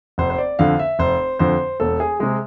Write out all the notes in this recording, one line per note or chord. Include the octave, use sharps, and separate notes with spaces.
F1 C5
C5
D5
F2 D3 F5
E5
F1 C5
F2 D3 C5
E1 A4
G#4
C3 G#3 G#4